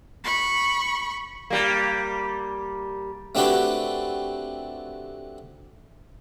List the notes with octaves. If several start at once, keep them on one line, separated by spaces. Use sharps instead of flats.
B5 C#6
G3 A#3
A3 C4 D4 F#4 G4 B4